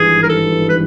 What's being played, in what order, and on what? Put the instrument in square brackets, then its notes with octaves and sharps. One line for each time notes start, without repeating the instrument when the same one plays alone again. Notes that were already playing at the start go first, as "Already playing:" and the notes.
Already playing: [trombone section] G#1 G2 E3 [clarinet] G#4
[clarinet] A#4
A4
B4